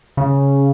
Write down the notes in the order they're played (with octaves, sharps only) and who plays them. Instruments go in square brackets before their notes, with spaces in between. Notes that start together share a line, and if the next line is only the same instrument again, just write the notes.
[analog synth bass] C#3